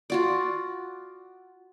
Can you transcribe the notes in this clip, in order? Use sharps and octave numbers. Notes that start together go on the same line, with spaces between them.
F4 F#4 D5